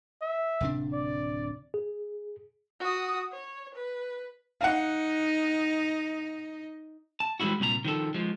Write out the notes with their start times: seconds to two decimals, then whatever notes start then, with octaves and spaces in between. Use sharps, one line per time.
0.22 E5
0.61 D1 C3 D4
0.93 D5
1.74 G#4
2.80 F#4 D#6
3.32 C#5
3.75 B4
4.61 D#4 F5 F#5
7.20 A5
7.40 E3 G3 G#3 D4 E4 F#4
7.60 C2 A#2 F#4 A#5
7.85 D#3 F3 A4
8.14 F3 G#3